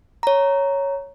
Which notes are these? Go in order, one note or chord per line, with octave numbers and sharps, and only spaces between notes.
C#5 A#5